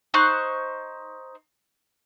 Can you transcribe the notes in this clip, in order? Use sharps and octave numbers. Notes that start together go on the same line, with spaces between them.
D#4 C5 C#6 F#6